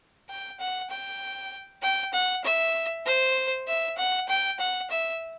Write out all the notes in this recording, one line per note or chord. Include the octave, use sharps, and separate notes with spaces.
G5
F#5
G5
G5
F#5
E5
C5
E5
F#5
G5
F#5
E5